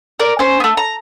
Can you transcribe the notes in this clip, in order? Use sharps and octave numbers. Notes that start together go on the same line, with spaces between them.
A#4 D5
C#4 C5
A3 B3
A#5